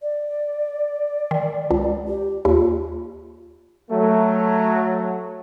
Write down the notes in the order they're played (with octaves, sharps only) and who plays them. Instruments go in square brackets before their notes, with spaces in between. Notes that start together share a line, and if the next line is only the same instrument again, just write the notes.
[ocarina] D5
[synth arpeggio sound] D#3
C#2
[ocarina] G4
[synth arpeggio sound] D#2 [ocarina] F4
[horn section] F#3 A3